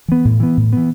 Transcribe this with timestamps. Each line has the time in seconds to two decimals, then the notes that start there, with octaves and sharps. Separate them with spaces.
0.08 E3 B3
0.25 A2
0.40 E3 B3
0.57 A2
0.73 E3 B3